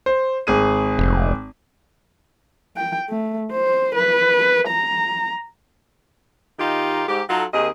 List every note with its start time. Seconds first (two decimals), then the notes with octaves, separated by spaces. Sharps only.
0.06 C5
0.47 G#1 G#4 D#7
0.99 F1
2.76 G5
3.10 A3
3.52 C5
3.95 B4
4.67 A#5
6.59 D#3 D#4 F4 G4
7.08 G#2 G4
7.29 F#3 D#4 F4 A4
7.53 D#2 D#3 C4 G#4 D#5